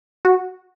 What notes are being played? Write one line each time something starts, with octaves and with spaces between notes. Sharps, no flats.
F#4